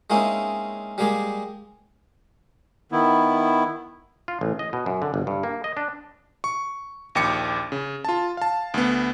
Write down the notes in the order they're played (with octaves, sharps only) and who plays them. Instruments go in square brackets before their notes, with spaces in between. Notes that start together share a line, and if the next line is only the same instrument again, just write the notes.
[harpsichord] G#3 A#3 C4 C#4 D#4 E4
G3 G#3 A#3 G4 G#4
[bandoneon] D#3 B3 E4
[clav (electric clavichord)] F4
A1
D#5
B2
F#2
D3
G1
G2
A#3
D#5
D4
[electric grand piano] C#6
A#1 D#2 G5 D6 C#7
C#3
F4 A5
F5 A5
D2 B3